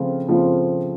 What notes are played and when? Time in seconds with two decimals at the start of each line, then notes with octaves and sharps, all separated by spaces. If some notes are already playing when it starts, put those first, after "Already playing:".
Already playing: C#3 F3 A3 C4 F4
0.28 C#3 F3 A3 C4 F4